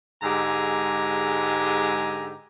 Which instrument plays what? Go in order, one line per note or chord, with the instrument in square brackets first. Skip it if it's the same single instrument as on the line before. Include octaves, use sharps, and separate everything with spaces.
[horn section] G#2 D3 G#3 G4 G#5 A#5